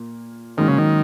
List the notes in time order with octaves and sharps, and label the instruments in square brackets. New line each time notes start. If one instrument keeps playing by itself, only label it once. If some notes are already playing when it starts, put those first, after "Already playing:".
Already playing: [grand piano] A#2 A#3
[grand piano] G#2 F#3 A#3 C#4 [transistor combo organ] D#3
[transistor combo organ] C#3
D#3